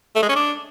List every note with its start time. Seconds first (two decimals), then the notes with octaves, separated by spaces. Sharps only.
0.16 A3
0.22 G#3
0.29 C#4
0.35 D4